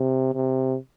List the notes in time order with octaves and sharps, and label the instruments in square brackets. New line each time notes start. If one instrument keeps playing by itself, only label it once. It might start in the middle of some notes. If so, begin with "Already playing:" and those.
Already playing: [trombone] C3
C3